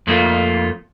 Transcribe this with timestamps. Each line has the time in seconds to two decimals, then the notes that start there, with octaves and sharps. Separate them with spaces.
0.07 F2 A3 A#3 D4 F4